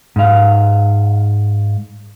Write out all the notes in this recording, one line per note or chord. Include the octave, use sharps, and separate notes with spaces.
G#2 F5